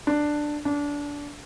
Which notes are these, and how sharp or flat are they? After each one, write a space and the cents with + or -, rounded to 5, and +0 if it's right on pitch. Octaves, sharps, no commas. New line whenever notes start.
D4 +10
D4 -20